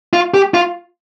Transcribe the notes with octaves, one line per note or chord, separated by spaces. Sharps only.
F4
G4
F4